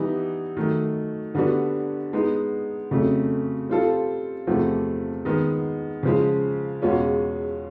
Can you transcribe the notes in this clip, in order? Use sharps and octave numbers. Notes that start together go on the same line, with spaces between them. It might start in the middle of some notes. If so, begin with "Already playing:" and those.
Already playing: E3 G3 B3 D#4
D#3 F#3 A3
D3 G3 B3 D4 F#4
G#3 B3 D#4
F2 C#3 F#3 A3
G3 C4 F4 A4
E2 C3 F3 A3
D#3 G#3 B3
C#3 F3 G#3
E2 B2 G#3 C#4 F4